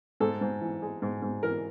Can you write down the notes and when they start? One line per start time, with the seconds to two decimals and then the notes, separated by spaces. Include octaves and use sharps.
0.20 G#2 A4
0.41 G#2
0.61 E3
0.82 G#3
1.02 G#2
1.22 G#2
1.43 E3 A#4